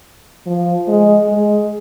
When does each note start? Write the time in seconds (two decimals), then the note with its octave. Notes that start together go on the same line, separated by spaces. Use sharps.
0.47 F3
0.88 G#3
1.29 G#3